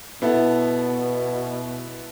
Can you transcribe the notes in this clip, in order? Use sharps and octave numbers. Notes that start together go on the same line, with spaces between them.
B2 B3 E4 A4